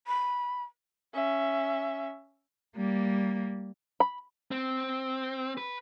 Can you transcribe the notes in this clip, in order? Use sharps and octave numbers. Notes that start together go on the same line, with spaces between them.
B5
C#4 E5
G3 A#3
B5
C4
B4